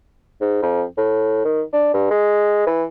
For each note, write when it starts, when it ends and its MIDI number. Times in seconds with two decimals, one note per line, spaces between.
0.41 0.59 44
0.62 0.84 41
0.97 1.42 45
1.45 1.62 51
1.73 1.89 62
1.94 2.08 43
2.10 2.61 56
2.67 2.84 52